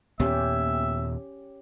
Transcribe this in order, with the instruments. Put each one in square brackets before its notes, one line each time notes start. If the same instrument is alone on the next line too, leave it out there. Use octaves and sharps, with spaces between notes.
[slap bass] D#2 A#2 B3 [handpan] C#4 G4 [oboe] E5